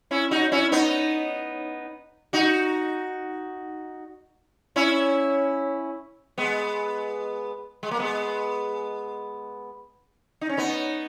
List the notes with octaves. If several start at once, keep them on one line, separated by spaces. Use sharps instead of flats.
C#4 E4
D#4 F#4
C#4 E4
B3 D#4
D#4 F#4
C#4 E4
G#3 B3
G#3
A#3
G#3 B3
D#4
C#4
B3 D#4